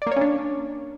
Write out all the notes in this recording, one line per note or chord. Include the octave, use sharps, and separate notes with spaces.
A#3 C#4 D4 C#5 D5